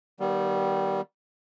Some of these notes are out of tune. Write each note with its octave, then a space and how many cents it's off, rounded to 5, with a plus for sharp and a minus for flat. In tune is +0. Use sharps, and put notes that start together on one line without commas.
D#3 +0 G3 -15 B3 -30